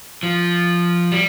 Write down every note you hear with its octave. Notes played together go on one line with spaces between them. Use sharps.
F3
G3